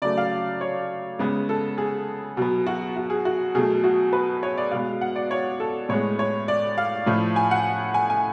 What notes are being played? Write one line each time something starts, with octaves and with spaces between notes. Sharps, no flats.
C#3 F#3 A3 D5
F5
C#5
C#3 G#3 B3
A4
G#4
B2 F#3 B3
F#4
F#4
G#4
F#4
B2 F#3 A3 G#4
F#4
B4
C#5
D5
B2 G#3 B3 F5
F#5
D5
C#5
A4
A2 G#3 B3 C#5
C#5
D5
F5
A2 F3 A3
G#5
F#5
G#5
G#5